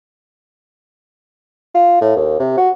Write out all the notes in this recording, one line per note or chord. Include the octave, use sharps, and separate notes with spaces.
F4
A2
D#2
C3
F#4